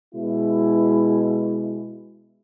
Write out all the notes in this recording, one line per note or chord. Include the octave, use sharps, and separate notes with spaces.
B2 G#3 E4